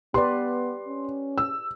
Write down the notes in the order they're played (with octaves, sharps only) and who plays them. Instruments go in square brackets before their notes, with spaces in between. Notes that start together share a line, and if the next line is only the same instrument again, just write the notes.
[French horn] B3 [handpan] G4 B4 D5 [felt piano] C6
[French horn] C#4
[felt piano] E6